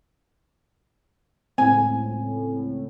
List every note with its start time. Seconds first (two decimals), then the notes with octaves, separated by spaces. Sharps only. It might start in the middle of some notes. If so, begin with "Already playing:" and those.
1.58 C#2 A2 C4 G#5